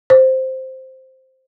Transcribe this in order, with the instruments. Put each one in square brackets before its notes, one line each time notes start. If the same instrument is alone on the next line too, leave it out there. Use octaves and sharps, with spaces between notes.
[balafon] C5